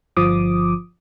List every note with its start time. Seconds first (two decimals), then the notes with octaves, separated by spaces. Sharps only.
0.17 G1 F3 D6 D#6